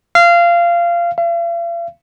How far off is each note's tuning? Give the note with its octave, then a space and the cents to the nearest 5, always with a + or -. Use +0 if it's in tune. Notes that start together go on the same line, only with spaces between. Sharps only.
F5 -20
F5 -45